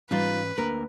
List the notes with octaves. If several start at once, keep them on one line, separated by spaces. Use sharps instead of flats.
G#2 E3 G3 C#4 D#4 F4 B4
D2 A#3 D4 A#4